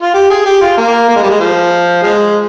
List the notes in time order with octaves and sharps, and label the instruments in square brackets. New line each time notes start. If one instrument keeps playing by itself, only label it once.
[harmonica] F4
G4
G#4
G4
F4
A#3
A#3
G#3
G3
G#3
F3
F3 G#3